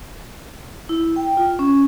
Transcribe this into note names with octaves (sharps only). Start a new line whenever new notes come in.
E4
G5
F4
C#4